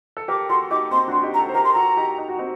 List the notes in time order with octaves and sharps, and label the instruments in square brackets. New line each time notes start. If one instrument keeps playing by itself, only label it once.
[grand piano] A4
[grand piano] G4 A#4 [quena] D6
[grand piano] F#4 A4 [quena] C6
[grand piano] D#4 G4 [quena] D6
[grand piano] C4 D#4 [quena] C6
[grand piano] D4 F#4 [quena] C6
[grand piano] D#4 G4
[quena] A#5
[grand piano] F#4 A4
C5
[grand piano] G4 A#4 [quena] A#5
[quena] C6
[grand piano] F#4 A4 [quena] A#5
[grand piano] D#4 G4
D#4
F#4
C4 D#4